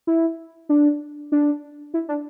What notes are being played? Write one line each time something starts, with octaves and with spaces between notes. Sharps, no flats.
E4
D4
D4
E4
D4